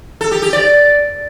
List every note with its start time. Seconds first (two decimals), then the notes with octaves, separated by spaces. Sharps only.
0.21 A4
0.31 G4
0.42 G4
0.53 D5